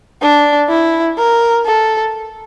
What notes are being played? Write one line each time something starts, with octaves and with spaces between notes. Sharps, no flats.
D4
E4
A#4
A4